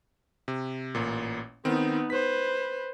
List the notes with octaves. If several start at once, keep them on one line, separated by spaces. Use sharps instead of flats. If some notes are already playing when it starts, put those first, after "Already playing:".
C3
A1 A#2
D#3 B3 C4 D#4
B4 C5 B6